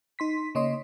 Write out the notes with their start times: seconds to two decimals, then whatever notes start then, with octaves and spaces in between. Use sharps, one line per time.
0.19 D#4 C6 B6
0.55 C#3 A#3 C#5 D#5 C6